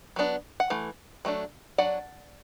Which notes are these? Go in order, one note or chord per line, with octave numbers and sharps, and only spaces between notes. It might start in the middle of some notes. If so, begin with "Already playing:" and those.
F#3 B3 D4
F#5
E3 A3
F#3 A3 D4
F#3 D4 D5 F#5